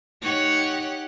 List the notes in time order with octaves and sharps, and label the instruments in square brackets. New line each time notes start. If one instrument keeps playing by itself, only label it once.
[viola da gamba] D#4 C#5 [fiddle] G4 F#5